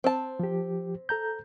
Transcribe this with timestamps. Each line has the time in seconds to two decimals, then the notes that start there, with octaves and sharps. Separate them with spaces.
0.04 C4 A5
0.39 F3 G4
1.09 A4 A#5 G6